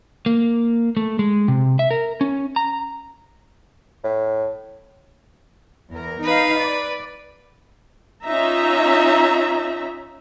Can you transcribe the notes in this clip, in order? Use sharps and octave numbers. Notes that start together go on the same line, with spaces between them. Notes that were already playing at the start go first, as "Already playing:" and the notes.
A#3
A3
G#3
C3
E5
A#4
C#4
A#5
A2
E2 A#4
D#4 B4 F5
D5
C#4 D#4 F4 E5 A#5